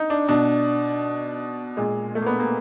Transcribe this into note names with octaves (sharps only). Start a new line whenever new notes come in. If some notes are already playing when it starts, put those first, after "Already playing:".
Already playing: D#4
D4
B2 D4
A#2 G#3
A3
A#3
B3
A#3